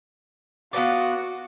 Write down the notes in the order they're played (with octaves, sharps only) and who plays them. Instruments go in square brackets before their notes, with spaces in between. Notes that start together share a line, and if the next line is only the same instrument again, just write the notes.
[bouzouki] B3 F4 B4 D5 [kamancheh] F#4